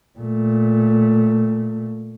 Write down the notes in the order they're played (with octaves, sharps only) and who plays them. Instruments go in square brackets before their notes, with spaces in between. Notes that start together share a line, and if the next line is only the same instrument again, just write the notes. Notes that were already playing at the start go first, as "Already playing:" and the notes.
[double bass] A#2 A3